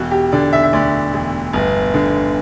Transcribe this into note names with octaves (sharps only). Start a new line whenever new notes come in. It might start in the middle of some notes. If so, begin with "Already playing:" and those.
Already playing: E1 F#4
G4
D3 D5
E5
E5
D2 D5
E1
G1
D3